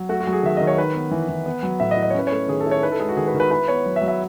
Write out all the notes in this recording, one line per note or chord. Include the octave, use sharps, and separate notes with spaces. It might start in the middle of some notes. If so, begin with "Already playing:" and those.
Already playing: F#3
A3 F#4
F#4
F#3
G#4
D#3 E5
D#3 D#5
C#5
D#4 B4
B3
E3
E3
B3
F#3
A2 E5
D#5
E4
D#5
C#5
C#4 B4
C#5
A3
D#3 G#4
A4
E4
C#5
D#4 B4
A4
G#3 G#4
F#4
D#3 G#4
B4
D#3
B4
E4 B4
B3 C#5
F#3
E5
F#3
E5